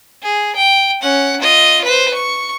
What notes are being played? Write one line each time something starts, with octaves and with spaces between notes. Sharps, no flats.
G#4
G5
C#4 F#5
F4 D#5
B4 C5
C#6